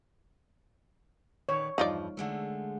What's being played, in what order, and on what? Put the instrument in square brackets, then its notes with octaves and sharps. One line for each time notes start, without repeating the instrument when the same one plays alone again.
[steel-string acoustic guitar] A#2 D#3 B4 [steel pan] C#5
[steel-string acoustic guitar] E2 G2 F3 [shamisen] D#4 F4 D5
[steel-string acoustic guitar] D3 G#3 A3